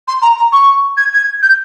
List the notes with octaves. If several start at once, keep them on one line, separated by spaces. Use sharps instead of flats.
C6
A#5
A#5
C#6
G#6
G#6
G6